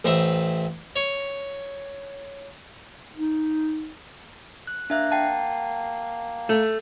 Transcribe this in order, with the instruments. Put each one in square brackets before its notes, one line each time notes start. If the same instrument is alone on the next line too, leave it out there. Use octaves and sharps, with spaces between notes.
[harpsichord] A1 C4 D#5 E5
C#5
[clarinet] D#4
[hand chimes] F#6
[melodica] A#3 [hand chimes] D4 E5 F#6
[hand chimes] F#5 G5 A5
[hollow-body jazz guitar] A3